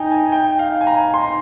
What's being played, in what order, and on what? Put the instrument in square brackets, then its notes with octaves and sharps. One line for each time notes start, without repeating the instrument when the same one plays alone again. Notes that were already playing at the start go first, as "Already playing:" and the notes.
Already playing: [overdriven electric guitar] D#4 [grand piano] G5 G#5
[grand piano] G#5
G5
F5
G#5
A#5
C6